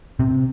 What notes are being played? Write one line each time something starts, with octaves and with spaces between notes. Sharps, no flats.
C3